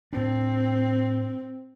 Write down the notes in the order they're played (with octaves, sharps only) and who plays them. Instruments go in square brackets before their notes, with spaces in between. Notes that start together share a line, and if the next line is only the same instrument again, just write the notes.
[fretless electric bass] A2 D4 [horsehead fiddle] C4